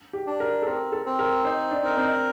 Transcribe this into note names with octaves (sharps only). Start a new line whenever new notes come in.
G4
D4
A#4
A4
C4 A#4
A4
C4
A#4
D#4 C5
D4
A#4
C4